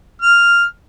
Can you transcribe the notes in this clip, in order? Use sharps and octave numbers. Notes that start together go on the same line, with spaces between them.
F6